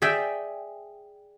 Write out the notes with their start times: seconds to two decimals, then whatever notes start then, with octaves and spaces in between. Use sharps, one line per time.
0.02 G#4 D5 E5 G5